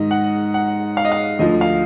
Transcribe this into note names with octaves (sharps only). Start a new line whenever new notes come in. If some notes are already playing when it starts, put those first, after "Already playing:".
Already playing: G#2 D#3 D#5
F#5
F#5
F5
D#5
F5
D2 D3 F3 D#5
F5